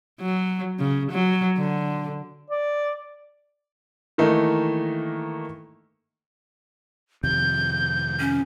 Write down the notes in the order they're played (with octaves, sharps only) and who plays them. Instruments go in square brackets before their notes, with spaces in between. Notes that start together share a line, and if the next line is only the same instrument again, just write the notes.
[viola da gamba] F#3
C#3
F#3
D3
[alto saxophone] D5
[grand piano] D#3 E3 A3 A#3 D#4
[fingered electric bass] F2 C3 D#3 [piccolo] G6
[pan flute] C#4